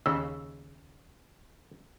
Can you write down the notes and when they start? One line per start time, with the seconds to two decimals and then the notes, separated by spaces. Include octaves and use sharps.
0.06 D#2 C#3 E6